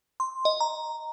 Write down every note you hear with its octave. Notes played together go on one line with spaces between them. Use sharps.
C6
D#5
A#5